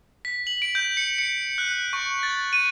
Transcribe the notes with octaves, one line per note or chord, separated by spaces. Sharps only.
B6
F#7
D7
G6
C#7
C#7
F#6
C#6
A6
D#7